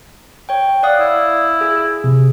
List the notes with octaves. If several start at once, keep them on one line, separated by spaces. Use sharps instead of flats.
C#5 G5
D5 F5 F#5 D#6
E4
G#4
C3